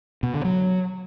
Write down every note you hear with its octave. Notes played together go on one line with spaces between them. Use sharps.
B2
D3
F#3